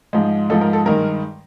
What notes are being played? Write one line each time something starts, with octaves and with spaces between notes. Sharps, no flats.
G#2 F3 G#3
G#2 F3 G#3 A4
A#4
A4
G2 D#3 G#3 A#4